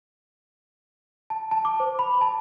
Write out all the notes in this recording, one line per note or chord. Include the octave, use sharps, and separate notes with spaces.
A5
A5
D6
C5
B5
A5